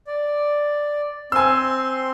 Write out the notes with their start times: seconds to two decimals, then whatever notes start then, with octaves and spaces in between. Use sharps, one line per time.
0.07 D5
1.32 C4 G#5 C6 E6